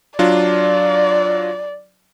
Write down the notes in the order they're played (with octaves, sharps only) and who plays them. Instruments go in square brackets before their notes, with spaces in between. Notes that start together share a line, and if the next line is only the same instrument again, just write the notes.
[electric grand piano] F#3 D4 F4 [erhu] D5